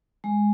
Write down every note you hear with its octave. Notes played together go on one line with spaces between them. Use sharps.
G#3